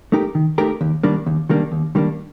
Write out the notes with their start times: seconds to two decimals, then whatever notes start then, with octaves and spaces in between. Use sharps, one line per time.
0.12 A3 D#4 G4 A#4
0.35 D#3
0.58 A3 D#4 G4 A#4
0.81 D#2
1.03 D#3 G3 A#3 D4
1.26 D#2
1.49 D#3 G3 A#3 D4
1.72 D#2
1.95 D#3 G3 A#3 D4